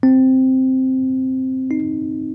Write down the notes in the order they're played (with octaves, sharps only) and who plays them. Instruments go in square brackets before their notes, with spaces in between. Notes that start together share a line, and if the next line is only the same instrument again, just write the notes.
[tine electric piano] C4
D#4